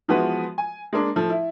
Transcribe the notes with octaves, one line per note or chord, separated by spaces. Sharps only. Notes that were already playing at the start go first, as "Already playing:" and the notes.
E3 F3 G#3 B3 F#4 B4
G#5
G#3 A#3 D4
F3 A3
E4